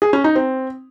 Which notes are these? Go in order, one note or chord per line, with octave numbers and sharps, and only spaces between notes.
G#4
C#4
D#4
C4